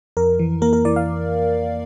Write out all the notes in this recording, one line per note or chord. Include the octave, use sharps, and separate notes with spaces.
F2 A#4
E3
A#3 A#4
A#4
E3 D5
F5